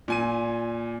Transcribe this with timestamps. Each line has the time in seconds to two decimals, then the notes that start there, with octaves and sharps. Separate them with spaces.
0.08 A#2 G#5 D#7